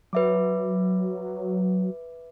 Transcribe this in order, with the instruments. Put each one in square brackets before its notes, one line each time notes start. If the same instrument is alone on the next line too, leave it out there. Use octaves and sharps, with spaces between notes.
[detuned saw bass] F#3 [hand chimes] B4 E5 D6